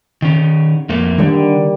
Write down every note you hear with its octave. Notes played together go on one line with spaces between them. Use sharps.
D#3 C#4
F2 A3 A#3
D3 D#3 G3